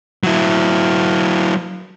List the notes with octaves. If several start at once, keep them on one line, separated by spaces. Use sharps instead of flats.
F#3 E4